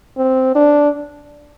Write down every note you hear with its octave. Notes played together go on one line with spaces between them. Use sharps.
C4
D4